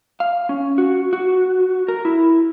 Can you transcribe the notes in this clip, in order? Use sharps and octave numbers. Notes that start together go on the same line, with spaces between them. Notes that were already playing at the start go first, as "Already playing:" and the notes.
F5
C#4
F#4
F#4
A#4
E4